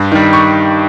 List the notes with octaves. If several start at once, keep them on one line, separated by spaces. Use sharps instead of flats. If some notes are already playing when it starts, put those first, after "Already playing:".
Already playing: G2
D#3 G3
C#6